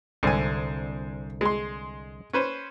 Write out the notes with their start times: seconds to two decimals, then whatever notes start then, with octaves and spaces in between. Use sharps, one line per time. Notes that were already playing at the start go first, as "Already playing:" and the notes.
0.23 C2 G#2 D3 G#5
1.41 G#3 C6
2.33 C#4 B4 C5